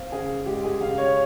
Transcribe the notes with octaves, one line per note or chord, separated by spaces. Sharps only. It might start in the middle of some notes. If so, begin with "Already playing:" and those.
Already playing: C4 F5
C#3 G#4
G#3 G4
G#4
C#3 F5
C#5